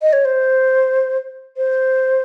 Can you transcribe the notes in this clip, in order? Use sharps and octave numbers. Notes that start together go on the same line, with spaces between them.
D#5
C#5
C5
C5